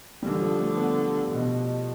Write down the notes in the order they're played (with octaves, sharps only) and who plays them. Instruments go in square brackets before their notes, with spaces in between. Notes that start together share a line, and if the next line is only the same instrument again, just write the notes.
[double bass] D3 [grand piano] G3
[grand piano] F3
A3
B3
[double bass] B2